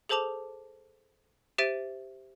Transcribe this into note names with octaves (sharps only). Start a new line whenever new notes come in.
G#4 A4 C5 A5 D6 F7
G4 C5 E5 A6 D7 D#7